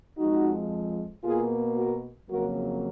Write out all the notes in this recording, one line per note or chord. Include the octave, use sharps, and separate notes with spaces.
F2 F3 G#3 D#4 F#4
B2 A#3 F4 G#4
F#4 A#4
F2 C#3 F#3 A#3 F#4 A#4